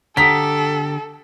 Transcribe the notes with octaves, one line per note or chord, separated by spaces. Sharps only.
D3 G4 A4 F#5 A#5 D#6 B6